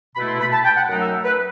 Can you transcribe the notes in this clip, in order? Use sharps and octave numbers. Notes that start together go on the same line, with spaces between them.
B2 A3 E4 B5
C6
B5
A5
G5
F#5
F#2 F#3 A3 D#4 F#5
E5
B4